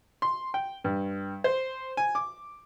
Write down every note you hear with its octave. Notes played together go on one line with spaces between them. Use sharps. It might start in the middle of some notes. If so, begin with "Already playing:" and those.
C6
G5
G2
C5
G#5
D6